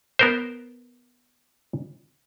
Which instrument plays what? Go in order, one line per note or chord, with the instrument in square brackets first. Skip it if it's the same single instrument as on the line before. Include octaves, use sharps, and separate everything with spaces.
[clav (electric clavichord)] B3 A#4 C5